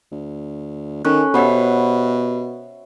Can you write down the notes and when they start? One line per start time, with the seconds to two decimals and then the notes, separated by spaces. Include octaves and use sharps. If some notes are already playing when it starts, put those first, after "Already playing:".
0.12 D2
1.05 D#3 C#4 A4 C#6 F#6
1.34 B2 G4 C5 C#5 E5 F#5 B5